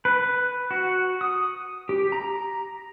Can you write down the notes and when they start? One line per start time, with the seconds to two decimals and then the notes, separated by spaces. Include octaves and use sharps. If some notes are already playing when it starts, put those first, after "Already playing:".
0.05 B4
0.71 F#4
1.21 D#6
1.89 G4
2.12 A#5